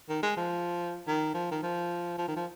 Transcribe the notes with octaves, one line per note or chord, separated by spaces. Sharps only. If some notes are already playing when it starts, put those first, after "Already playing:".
D#3
G#3
F3
D#3
F3
D#3
F3
F3
D#3
F3